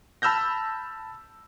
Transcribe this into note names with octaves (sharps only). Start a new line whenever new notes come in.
A5 B5 E6 F6 G6 A#6